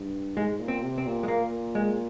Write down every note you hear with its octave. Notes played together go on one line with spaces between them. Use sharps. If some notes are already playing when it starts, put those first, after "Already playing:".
Already playing: G2
G#2 G#3
A#2
C4
C3
C4
A#2
G#3
A#3
G#3